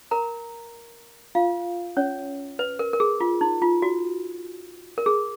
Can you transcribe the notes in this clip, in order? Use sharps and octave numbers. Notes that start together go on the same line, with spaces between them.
A#4 A#5
F4 F5
C#4 C#5
B4
A#4
A#4
G#4
F4
D#4
F4
F#4
A#4
G#4